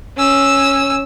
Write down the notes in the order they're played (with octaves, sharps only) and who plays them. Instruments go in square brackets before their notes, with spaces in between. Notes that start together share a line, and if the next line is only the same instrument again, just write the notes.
[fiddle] C#4 E6